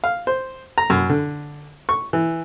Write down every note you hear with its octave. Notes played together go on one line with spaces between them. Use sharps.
F5
C5
A#5
F#2
D3
C#6
E3